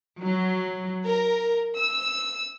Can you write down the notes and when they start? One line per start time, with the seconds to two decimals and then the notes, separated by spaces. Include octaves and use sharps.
0.20 F#3
1.05 A#4
1.77 E6